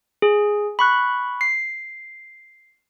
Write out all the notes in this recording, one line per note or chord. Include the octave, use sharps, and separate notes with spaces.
G#4
B5 C#6 F#6
C7